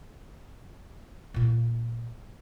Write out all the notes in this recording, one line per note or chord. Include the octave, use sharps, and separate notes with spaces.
A#2 F4